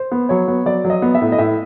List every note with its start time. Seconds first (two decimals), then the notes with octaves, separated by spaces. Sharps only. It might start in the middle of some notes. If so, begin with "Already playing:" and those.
Already playing: C5
0.12 B3
0.29 F#3 C#5
0.48 B3
0.66 F#3 D5
0.84 F#3
0.90 D#5
1.02 B3
1.15 E5
1.21 A2
1.32 D#5
1.38 A2 E5